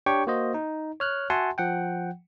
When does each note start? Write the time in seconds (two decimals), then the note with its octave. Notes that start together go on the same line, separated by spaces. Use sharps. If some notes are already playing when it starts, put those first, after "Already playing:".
0.06 D4 G4 C#5 G5 C#6
0.27 A#3 F#4 C5 D#5
0.54 D#4
1.00 C#5 F6 F#6
1.30 F#4 E5 F#5 G#5 A5 C6
1.58 F3 F#5 G5